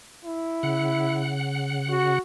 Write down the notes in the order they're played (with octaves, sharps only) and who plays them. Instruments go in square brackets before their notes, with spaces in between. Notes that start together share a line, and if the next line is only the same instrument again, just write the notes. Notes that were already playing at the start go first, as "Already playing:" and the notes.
[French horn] E4
[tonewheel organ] C#3 F#5
[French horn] F#4